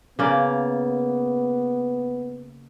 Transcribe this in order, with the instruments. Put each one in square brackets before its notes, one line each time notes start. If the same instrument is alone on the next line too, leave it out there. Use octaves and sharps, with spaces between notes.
[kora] C#3 A#3 D5 [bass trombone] B3